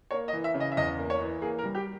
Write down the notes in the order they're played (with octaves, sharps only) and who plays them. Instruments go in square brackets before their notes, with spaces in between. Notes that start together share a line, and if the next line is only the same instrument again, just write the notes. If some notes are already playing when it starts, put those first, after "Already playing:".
[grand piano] A#3 C#5
D#5
E3
E5
C#3
D#5
E5
E2 D#5
A#3
C#5
E3
A#3 G#4
A#4
G3
G4